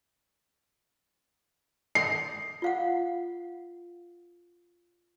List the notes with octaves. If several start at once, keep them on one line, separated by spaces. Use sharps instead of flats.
C7
F4 F5 F#5